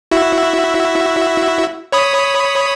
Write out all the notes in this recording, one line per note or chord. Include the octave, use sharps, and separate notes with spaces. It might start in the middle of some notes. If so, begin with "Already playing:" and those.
E4 F#4 E5
C#5 B5 D#6